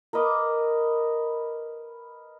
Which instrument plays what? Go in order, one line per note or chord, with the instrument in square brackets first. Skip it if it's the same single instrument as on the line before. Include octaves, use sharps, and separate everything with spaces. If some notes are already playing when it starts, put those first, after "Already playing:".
[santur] A#4 B4 D#5 D6